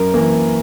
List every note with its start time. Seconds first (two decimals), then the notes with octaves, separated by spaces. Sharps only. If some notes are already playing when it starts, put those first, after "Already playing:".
Already playing: F#2 A#4
0.14 E3 A#3